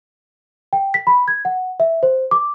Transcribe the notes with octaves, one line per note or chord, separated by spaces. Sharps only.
G5
B6
B5
G#6
F#5
E5
C5
D6